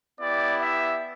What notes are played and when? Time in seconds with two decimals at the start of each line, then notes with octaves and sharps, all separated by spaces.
0.20 B3 E4 G4 D5
0.61 E5